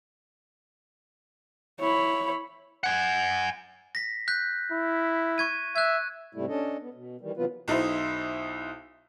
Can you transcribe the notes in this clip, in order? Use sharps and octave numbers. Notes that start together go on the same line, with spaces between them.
E4 C#5 B5
F#5 G#5
A#6 B6
F#6 G6 B6
E4
C#6 G#6 D#7
E5 F#6 G#6
G#2 C3 G3 A3 E4
C#4 D4 A4 D#5
B3
B2
D#3 E3 G3
C3 E3 F#3 B3 F4 B4
B1 D#4 E4 C5